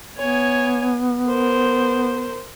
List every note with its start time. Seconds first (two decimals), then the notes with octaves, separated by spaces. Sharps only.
0.18 B3 C#5 G#5
1.27 A#4 C5